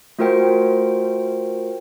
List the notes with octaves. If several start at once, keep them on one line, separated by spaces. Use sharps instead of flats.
A3 F4 F#4 A#4 C5 G5